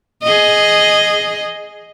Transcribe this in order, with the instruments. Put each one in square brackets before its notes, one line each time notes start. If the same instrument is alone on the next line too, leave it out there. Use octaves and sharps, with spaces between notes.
[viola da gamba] G#4 D#5